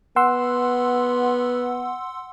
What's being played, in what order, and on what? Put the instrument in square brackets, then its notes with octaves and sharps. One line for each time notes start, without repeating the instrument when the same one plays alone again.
[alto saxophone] B3 [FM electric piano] F#5 C6 E6